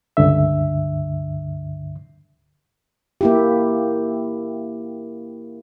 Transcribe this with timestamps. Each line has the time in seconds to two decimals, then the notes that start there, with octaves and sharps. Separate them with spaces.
0.17 C#2 G2 D3 E5
3.21 A#3 E4 G4